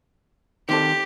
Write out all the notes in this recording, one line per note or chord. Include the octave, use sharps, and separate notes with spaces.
D#3 C4 G4 A4